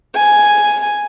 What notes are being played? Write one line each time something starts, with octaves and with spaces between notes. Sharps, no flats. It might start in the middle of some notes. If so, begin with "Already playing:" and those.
G#5